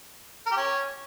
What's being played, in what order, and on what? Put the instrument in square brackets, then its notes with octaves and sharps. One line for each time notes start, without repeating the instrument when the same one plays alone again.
[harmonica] A#4
G4
C#4